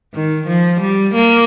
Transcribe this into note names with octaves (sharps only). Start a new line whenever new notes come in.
D#3
F3
G3
A#3